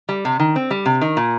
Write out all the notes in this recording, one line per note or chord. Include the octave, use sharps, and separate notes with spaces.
G3
C3
D#3
C4
G3
C3
D#3
A#2